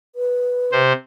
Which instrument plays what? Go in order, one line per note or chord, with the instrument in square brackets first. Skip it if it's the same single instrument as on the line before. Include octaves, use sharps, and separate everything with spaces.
[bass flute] B4
[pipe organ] C3 C5